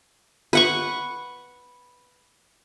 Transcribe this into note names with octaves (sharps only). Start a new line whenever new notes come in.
B4 F#5 C#6